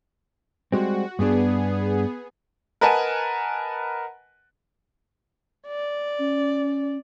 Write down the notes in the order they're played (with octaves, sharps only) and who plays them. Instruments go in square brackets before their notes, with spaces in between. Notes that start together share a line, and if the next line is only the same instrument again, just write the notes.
[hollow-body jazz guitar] G3 G#3 C4 [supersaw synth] F#4
[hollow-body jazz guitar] G2 D4 [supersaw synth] B3 G#4
[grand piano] A#4 B4 D#5 F#5 G#5 A5
[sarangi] D5
[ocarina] C#4